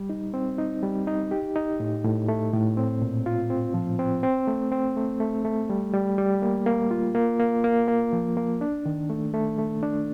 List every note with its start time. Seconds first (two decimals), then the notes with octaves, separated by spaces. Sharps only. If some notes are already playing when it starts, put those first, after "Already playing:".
Already playing: G3
0.10 D#4
0.34 C4
0.58 D#4
0.83 G3
1.07 D#4
1.31 G4
1.56 D#4
1.80 A2
2.04 A2
2.28 A3
2.53 A2
2.77 C4
3.02 A#2
3.26 F4
3.50 C4
3.74 F3
3.99 C4
4.23 C4
4.48 A3
4.72 C4
4.96 A3
5.20 A3
5.45 A3
5.70 G3
5.93 G3
6.18 G3
6.42 A#3
6.66 A#3
6.91 F4
7.15 A#3
7.40 A#3
7.64 A#3
7.88 A#3
8.13 F3
8.37 A#3
8.61 D4
8.86 D#3
9.10 A3
9.34 A3
9.58 A3
9.83 D4